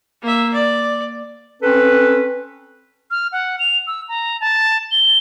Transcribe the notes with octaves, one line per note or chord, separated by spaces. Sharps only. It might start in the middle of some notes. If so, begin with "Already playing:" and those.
A#3 E5
D5
C4 C#4 A4 B4
F6
F#5
F7
E6
A#5
A5
G7